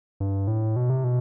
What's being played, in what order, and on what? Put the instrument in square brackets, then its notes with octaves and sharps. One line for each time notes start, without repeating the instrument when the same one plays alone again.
[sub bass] G2
A2
B2
C3
B2